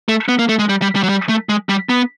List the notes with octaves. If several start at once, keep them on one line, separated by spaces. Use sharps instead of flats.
A3
B3
A#3
A3
G#3
G3
G3
G3
F#3
G3
A3
G#3
G3
B3